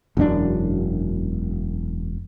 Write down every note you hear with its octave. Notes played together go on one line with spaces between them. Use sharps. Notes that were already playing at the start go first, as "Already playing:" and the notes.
E1 F#2 C#4 D4